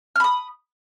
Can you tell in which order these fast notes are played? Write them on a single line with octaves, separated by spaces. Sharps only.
F6 B5 D#6